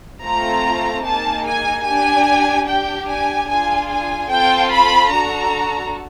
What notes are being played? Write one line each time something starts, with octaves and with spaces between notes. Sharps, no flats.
A3 C4 F4 A4 A#5
A#3 D#4 G#4 A5
G#5
D4 G4 G#5
D4 G4 G5
G#5
D4 F4 G#4 G#5
G#5
C4 F4 A4 G5
B5
D4 F#4 A4 A#5